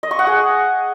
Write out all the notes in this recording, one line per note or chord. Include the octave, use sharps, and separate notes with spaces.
D#5
C#6
F#5
G#4